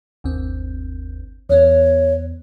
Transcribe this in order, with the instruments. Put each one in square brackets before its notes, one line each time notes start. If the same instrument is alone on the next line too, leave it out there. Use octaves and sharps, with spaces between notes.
[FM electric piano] G1 D#2 C4
[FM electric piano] E2 B3 [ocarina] C#5